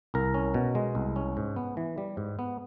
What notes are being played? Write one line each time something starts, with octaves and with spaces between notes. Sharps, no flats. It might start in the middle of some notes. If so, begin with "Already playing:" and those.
C2 A#4
C#4
B2
G#3
C2
C#4
G#2
B3
E3
G3
G#2
B3